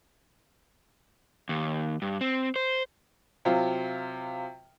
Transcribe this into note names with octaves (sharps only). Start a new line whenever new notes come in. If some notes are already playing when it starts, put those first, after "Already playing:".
D#2
G2
C4
C5
C3 F#3 F4